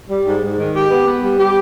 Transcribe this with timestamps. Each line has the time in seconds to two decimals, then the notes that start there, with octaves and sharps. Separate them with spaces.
0.09 G3
0.26 G#2
0.42 G#2
0.58 D#3
0.74 G4
0.90 B3
1.07 B3
1.22 G3
1.39 G4